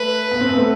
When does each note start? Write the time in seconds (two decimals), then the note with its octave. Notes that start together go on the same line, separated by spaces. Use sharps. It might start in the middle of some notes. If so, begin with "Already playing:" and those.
Already playing: A3 B4
0.32 B3
0.41 C4
0.49 B3
0.57 A3